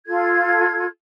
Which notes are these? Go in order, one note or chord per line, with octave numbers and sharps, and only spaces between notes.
F4 A4 G#6